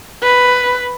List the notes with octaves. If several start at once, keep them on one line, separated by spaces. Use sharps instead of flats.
B4